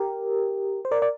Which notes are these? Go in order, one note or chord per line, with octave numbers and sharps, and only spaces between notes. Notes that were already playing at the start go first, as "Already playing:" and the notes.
Already playing: G4 A#4
C5
A#4 D5
D5